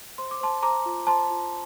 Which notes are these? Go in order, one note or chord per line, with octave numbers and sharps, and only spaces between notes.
C5 C6
D6
C5 A5 C6
C5 A#5 D6
F4
C5 A5 C6
F4